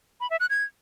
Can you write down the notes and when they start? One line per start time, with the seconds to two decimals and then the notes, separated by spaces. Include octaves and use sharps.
0.21 B5
0.30 E5
0.40 F#6
0.50 G#6